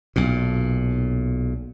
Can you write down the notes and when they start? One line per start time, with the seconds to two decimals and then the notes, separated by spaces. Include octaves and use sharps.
0.16 B1 A#2